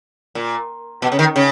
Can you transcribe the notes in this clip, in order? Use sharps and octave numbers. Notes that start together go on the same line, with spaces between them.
A#2
B2
C#3
D#3
C#3